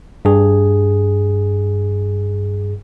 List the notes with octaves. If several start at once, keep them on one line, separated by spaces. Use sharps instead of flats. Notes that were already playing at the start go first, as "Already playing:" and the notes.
G2 G#4